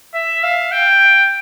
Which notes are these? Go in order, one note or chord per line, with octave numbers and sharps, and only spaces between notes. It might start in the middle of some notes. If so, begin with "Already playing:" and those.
E5
F5
G5